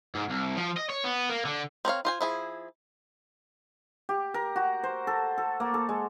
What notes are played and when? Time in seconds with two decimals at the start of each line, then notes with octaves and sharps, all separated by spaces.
0.15 G#2
0.30 C2
0.58 F3
0.77 D#5
0.90 C#5
1.04 B3
1.30 A#3
1.45 D3
1.85 C4 A#4 C#5 F5
2.05 F4 C5 G#5
2.21 F3 E4 G#4
4.09 G4
4.34 A#4
4.56 F#4
4.84 C5
5.07 A4
5.38 A4
5.60 A#3
5.74 A4
5.89 G#3